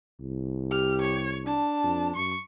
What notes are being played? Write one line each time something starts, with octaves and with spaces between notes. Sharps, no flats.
C2
G4 F6
C#5
D4 A5
F2
F#2 C#6